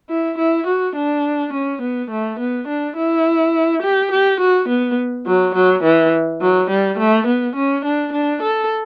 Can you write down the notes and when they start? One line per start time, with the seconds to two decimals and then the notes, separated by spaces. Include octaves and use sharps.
0.10 E4
0.38 E4
0.67 F#4
0.96 D4
1.53 C#4
1.82 B3
2.11 A3
2.39 B3
2.68 D4
2.97 E4
3.82 G4
4.11 G4
4.40 F#4
4.69 B3
5.26 F#3
5.55 F#3
5.83 E3
6.41 F#3
6.70 G3
6.98 A3
7.27 B3
7.56 C#4
7.85 D4
8.13 D4
8.42 A4